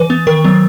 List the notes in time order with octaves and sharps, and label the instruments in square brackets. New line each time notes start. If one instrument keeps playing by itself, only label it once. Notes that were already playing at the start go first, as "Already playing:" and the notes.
Already playing: [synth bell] E3 B4
B3
D#3 A#4
F#3 B3